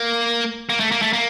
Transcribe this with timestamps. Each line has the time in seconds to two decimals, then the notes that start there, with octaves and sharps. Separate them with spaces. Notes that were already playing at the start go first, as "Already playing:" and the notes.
Already playing: A#3
0.70 A#3
0.80 A3
0.92 A#3
1.02 A3
1.13 A#3